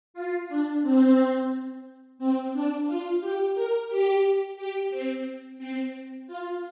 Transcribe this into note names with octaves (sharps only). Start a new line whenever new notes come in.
F4
D4
C4
C4
D4
F4
G4
A#4
G4
G4
C4
C4
F4